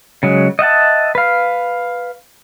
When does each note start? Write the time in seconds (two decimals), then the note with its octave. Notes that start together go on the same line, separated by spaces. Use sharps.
0.23 C#3 F#3 G#3
0.59 D#5 E5 F#5 A5
1.15 B4 F5